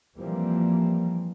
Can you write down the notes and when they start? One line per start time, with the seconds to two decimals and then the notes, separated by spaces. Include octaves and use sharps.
0.18 E3 F3 G3 A#3 C4